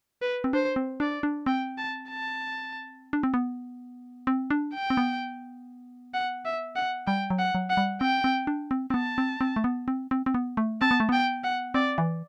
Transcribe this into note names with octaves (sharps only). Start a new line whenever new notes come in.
B4
C4
D4 C5
C4
D4 D5
D4
C4 G5
A5
A5
D4
C4
B3
C4
D4
G5
C4
B3
F#5
E5
F#5
G3 G5
F#3
F#5
F#3
F#5
G3
C4 G5
C4
D4
C4
C4
B3 A5
C4
C4
A3
B3
C4
C4
C4
B3
A3
C4 A5
B3
A3
B3 G5
F#5
C4 D5
E3